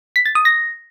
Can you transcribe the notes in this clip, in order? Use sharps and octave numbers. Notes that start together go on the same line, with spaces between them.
B6
A6
D#6
A#6